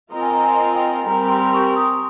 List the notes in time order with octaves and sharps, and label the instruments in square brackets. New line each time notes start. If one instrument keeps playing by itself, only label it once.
[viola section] C4 F4 A#4 D#5 [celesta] A#5
[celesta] G#5
A#5
G#5
G5
[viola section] G3 C4 G4 A#4 [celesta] A#5
[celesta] C6
C#6
D#6